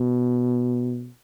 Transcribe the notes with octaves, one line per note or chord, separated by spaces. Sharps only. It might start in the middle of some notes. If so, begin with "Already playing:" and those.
Already playing: B2